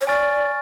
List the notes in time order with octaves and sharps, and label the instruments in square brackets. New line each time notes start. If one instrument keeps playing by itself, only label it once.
[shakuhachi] C#5
[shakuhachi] D5 [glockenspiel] G#5 C#6 F6 A6